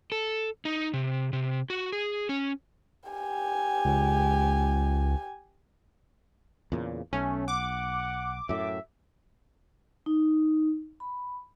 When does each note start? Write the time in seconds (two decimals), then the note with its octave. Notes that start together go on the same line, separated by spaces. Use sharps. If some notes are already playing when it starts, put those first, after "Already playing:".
0.12 A4
0.65 D#4
0.93 C3
1.33 C3
1.70 F#4
1.92 G#4
2.29 C#4
3.10 G4 G#5
3.85 C#2
6.72 E2 A#2 C#3
7.13 B1 A3 C#4
7.48 F#5 D6
8.49 F#2 A2 E5
10.06 D#4
11.00 B5